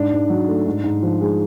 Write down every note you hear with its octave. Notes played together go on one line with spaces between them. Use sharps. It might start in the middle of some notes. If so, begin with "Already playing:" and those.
Already playing: G#2 D4
G#2
F#3
A3
G#2
G#2
F3
G#3